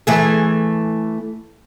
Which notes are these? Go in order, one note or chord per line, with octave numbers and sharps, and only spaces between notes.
E3 A3 G#4